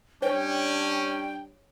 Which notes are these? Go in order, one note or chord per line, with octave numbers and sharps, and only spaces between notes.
G3 C#4 D4 C#5 G5